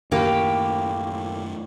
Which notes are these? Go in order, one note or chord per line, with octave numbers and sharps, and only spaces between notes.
F#2 A2 D#3 A3 A#3 G4